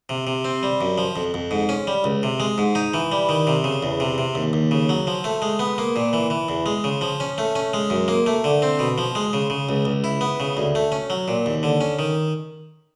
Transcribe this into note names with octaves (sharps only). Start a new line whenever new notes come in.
C3
C3
C4
G3
F#2
F3
F2
F2
G#2
C#4
G3
C#2
C3
G#3
G#2
D#4
E3
G3
D#3
C3
C#3
E2
C3
C3
D#2
D#2
C#3
F#3
F3
A3
G#3
B3
A#3
A#2
E3
E3
E2
G#3
C#3
F3
C#4
A3
C#4
G#3
F#2
A#3
A3
D3
C4
B2
F3
G#3
C#3
C#3
C#2
C#2
E4
B3
C#3
D2
A3
C#4
F#3
A#2
D#2
D3
C#4
D#3